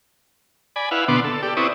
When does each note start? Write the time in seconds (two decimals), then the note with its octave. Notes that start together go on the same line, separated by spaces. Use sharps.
0.76 D5 G#5 B5
0.91 E4 B4 F5 F#5
1.08 B2 D3 B3 C6 D6
1.24 A4
1.43 G4 A4 D5
1.57 C4 E4 B4 D5 C#6 D#6